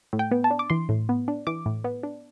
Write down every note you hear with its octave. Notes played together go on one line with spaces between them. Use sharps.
A2
G5
B3
A5
D4
D6
E3 C6
A2
B3
D4
E3 D6
A2
B3
D4